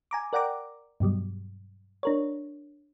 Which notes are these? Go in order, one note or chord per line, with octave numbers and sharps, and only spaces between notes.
G#5 A#5 D6
A#4 D5 F#5 G5 A#5 D6
G2 B2 F#3 G3
D4 A#4 C#5